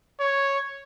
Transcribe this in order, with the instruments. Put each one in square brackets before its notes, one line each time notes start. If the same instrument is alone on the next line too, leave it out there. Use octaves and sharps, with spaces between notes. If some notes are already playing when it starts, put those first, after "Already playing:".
[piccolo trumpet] C#5